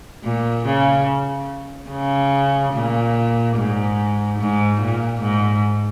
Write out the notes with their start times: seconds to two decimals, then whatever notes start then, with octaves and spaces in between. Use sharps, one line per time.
0.24 A#2
0.66 C#3
1.90 C#3
2.74 A#2
3.56 G#2
4.39 G#2
4.81 A#2
5.21 G#2